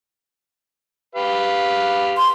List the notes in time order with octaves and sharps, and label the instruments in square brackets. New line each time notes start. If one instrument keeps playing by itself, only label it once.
[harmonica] G4 B4 F5
[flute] C6